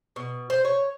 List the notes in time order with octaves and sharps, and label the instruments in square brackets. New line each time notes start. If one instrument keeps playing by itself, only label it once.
[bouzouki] B2
C5
C#5